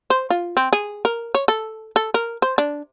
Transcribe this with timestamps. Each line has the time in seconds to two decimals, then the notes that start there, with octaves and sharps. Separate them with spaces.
0.10 C5
0.30 F4
0.57 C4
0.73 G#4
1.05 A#4
1.35 C#5
1.48 A4
1.96 A4
2.14 A#4
2.42 C5
2.58 D4